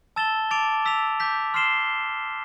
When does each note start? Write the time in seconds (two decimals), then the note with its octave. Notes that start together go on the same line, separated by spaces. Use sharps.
0.16 A5 E6 A6 E7 G7
0.51 A5 D6 A6 D7 F7
0.86 E6 B6 F7
1.20 D6 G6 B6
1.54 C6 F6 C7 E7 G7